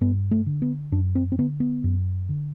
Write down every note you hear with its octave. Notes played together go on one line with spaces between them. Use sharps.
G2 B3
A3
D3
B3
F#2 D4
C4
C4
D3 B3
B3
F#2
D3